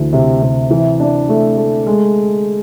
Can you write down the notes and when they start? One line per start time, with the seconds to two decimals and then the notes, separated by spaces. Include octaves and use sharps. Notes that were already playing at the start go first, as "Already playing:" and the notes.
Already playing: D2 E3
0.13 C3
0.42 C3
0.71 E3
1.00 D4
1.29 A3
1.57 A3
1.87 G#3